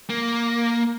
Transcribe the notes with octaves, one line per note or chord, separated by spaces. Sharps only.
A#3